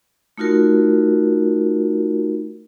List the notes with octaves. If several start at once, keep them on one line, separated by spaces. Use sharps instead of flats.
A3 D#4 F4 F#4 A#4